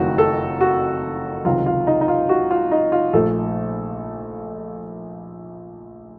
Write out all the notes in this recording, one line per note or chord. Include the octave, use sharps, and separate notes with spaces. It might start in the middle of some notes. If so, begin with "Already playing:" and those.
Already playing: F#1 F2 D#3 F#3 A3 F#4
A4
F#4
C#2 C3 D#3 F#3 F4
F4
D#4
D#4
F4
F#4
F4
D#4
F4
A#1 A#2 A3 A4